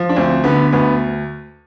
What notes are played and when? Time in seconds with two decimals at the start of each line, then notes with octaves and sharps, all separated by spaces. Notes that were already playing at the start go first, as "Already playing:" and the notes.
Already playing: F3
0.09 D4
0.16 D2 C4
0.44 D3 B3
0.72 D2 B3